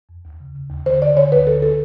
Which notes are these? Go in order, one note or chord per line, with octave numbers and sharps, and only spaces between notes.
F2
D#2
C#3
C#3
D#2
D3 C5
D3 D5
D3 C#5
D2 B4
D3 A4
A4